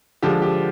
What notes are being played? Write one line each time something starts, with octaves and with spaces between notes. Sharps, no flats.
D3 F3 G#3 G4
G4